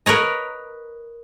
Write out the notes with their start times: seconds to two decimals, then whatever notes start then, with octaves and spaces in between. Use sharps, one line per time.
0.06 A#4 B4 C#5 D#5